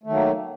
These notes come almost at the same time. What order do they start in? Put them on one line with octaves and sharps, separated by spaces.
A3 D#3 F#3 A#3